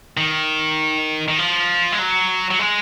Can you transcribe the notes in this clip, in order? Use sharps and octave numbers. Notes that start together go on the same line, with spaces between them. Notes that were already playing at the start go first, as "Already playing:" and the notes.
D#3
D#3
F3
G#3
F#3
F#3
G#3